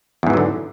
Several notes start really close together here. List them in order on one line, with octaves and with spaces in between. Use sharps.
E2 G#2 E3 F#3 D3